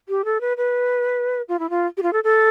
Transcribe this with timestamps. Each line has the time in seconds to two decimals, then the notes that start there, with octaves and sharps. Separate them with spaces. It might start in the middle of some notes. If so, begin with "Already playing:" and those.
0.09 G4
0.25 A4
0.41 B4
0.57 B4
1.49 F4
1.59 E4
1.70 F4
1.97 G4
2.03 F4
2.13 A4
2.24 A4